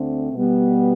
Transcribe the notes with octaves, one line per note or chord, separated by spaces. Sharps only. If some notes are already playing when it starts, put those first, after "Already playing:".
Already playing: D2 D3 A3 C4
B2 G3 B3